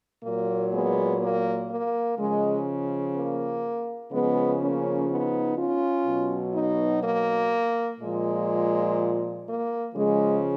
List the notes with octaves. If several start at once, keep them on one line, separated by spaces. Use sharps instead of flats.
A#2 F#3 A#3
G#3 B3
A#3
A#3
C#3 F3 G#3
A#3
C#3 F3 G#3 B3
A#3 C#4
B3 D#4
C#4 F4
B2 F#3
B3 D#4
A#3
A#2 F3 G#3
A#3
C#3 F3 G#3